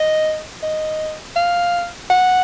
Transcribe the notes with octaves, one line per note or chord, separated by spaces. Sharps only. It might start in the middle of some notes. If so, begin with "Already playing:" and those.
Already playing: D#5
D#5
F5
F#5